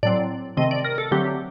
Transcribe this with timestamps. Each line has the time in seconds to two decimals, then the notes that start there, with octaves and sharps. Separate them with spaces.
0.03 A2 F#3 C4 D5
0.57 C3 D#3 A3 C4 D#5
0.71 D5
0.85 A#4
0.98 A4
1.11 D3 F#3 A3 C4 G4